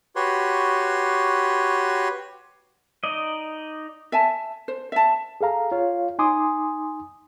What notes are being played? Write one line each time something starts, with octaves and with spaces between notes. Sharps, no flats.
F#4 G4 B4 C#5 C6
D#4 D5 D#5
E5 G#5 A5
C5
E5 A5
G#4 A4 F5 A#5
F4 C#5 F5
D#4 G#5 C6 D6 D#6